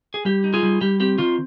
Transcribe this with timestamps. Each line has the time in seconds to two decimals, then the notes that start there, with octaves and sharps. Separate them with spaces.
0.14 G#4
0.25 G3 G4
0.44 D#4
0.54 F4 G#4
0.63 G3
0.81 G3 G4
1.00 C4 G4
1.18 D#3 F4